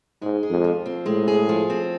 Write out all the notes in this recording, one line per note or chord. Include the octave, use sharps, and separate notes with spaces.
G#2 G#3
G#4
F2
F3
C4
A2 G#3
G#4
F3
C4